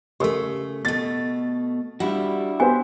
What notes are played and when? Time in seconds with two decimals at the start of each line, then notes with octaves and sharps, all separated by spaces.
0.20 C#3 A3 G4 A4 A#4
0.85 B2 A3 A6
2.00 G3 D4 E4 F#4
2.60 B3 G4 C5 G#5